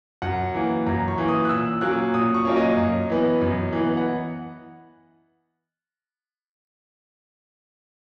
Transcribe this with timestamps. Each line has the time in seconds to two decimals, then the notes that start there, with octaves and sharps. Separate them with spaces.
0.22 F#2 F#5
0.54 E3 A#3
0.86 F#2 A#5
1.08 C#6
1.18 E3 A#3
1.28 D#6
1.45 F#6
1.49 A#2 E6
1.81 F#3 A#3 C#4 F#6
2.14 A#2 D#6
2.34 C#6
2.45 F#3 A#3 C#4 C#5
2.57 D#5
2.77 F#2
3.10 E3 B3
3.41 F#2
3.73 E3 B3
3.97 F#5